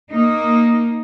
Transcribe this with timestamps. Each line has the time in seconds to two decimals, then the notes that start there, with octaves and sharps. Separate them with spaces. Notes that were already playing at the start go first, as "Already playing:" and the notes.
0.12 A#3 D#4